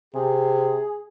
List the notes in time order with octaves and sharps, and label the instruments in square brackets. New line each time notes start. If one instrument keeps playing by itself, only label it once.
[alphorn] C3 [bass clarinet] G#4